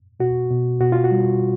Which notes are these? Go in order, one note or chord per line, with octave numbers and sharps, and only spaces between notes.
B2 F#4
B2
B2 F#4
F4
F#4
G3